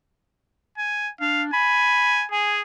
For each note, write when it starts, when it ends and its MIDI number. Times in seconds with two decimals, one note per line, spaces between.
0.78 1.10 80
1.21 1.48 62
1.21 1.43 77
1.53 2.26 80
1.53 2.23 83
2.32 2.61 68
2.32 2.55 80